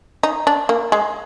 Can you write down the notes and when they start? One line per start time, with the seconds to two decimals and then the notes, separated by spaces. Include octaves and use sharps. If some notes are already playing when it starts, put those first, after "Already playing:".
0.23 D#4
0.47 D4
0.69 A#3
0.92 G#3